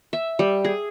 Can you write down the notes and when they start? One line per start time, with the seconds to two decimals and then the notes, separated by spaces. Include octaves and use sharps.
0.13 E5
0.39 G3
0.65 G#4